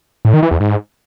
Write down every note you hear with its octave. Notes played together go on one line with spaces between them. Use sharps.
A2
D#3
E3
E2
G#2